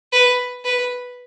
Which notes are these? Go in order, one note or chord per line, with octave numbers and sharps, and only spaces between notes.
B4
B4